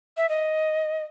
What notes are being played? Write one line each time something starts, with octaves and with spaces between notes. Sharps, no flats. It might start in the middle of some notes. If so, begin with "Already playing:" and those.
E5
D#5